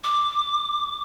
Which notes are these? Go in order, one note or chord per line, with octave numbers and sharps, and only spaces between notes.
D6